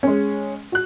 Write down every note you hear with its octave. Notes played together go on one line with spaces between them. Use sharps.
G#3 C#4
F#4 F#6